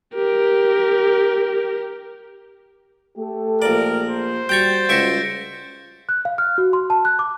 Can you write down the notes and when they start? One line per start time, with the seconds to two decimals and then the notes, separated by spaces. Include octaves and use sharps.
0.15 G4 A#4
3.17 A3 G4 A4
3.62 A#1 A#4 D5
4.10 C5
4.49 G3 F#4 G5 A#5 C#6 G6 A6
4.89 C#2 E5 C#6 A#6 C#7 D7
6.09 F#6
6.25 F5
6.38 F6
6.58 F#4
6.73 C6
6.90 A5
7.05 F#6
7.19 D6